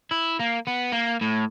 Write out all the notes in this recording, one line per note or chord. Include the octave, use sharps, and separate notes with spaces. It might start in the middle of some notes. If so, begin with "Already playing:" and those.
E4
A#3
B3
A#3
A2